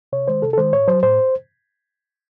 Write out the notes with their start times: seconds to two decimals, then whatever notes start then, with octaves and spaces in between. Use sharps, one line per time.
0.13 C3 C#5
0.28 D#3 G#3 C5
0.42 C3 A4
0.53 A4
0.57 D#3 G#3 C5
0.73 A2 C#5
0.88 F#3 C5
1.03 A2 C5